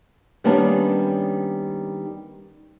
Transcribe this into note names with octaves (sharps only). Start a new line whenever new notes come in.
D#3 G3 A#3 B3 C#4 D4